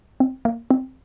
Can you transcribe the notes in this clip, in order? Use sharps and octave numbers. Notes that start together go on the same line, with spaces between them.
C4
A#3
C4